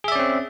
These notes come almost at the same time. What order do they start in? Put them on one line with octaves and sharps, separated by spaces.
G#4 E5 D5 C#4 C4